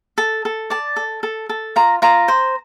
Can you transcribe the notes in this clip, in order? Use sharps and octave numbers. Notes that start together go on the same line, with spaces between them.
A4
A4
D5 A5
A4
A4
A4
F4 A#5
F4 A#5
C5